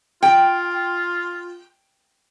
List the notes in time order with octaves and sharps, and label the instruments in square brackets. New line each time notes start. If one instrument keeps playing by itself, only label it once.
[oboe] F4 [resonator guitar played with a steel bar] G5